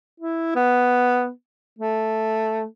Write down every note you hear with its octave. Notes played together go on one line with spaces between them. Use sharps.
E4
B3
A3